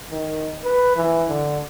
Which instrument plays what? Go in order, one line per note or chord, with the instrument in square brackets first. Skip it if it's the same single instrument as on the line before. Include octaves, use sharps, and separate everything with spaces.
[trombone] D#3
B4
E3
D3